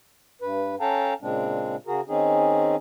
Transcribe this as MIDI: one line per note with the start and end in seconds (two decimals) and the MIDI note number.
0.42 0.75 43
0.42 0.75 71
0.80 1.14 61
0.80 1.14 69
0.80 1.14 77
0.80 1.14 79
0.80 1.14 81
0.80 1.14 82
1.22 1.76 46
1.22 1.76 49
1.22 1.76 56
1.22 1.76 60
1.22 1.76 62
1.87 2.01 49
1.87 2.01 66
1.87 2.01 68
1.87 2.01 70
2.08 2.76 51
2.08 2.76 60
2.08 2.76 61
2.08 2.76 63
2.08 2.76 68